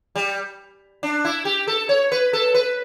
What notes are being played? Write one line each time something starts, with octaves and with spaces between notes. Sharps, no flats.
G3
D4
E4
G4
A4
C#5
B4
A4
B4